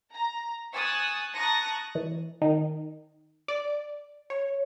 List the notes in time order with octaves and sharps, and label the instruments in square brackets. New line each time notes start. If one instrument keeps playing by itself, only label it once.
[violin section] A#5
G#5 C#6 D#6 E6 F#6 A6
A5 A#5 C#6 D#6 F#6 A#6
[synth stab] E3
D#3
D5
C#5